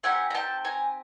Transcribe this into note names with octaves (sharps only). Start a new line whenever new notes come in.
C4 D#4 G4 F#5 G#5
A#5
G5 A5
G#5 A#5